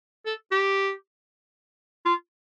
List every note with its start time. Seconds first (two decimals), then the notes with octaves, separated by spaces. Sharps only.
0.26 A4
0.51 G4
2.05 F4